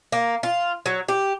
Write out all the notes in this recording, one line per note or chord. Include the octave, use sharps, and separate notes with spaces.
A#3
F4
F#3
G4